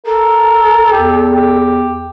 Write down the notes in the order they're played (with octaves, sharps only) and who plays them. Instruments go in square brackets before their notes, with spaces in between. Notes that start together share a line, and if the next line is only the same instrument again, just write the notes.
[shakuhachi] A4 [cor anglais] A#4
[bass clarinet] E2 [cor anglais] G4
[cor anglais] G4